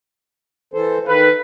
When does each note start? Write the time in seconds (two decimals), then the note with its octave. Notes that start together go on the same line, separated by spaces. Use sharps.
0.74 E3 A4 C5
1.07 D#3 A4 B4 F5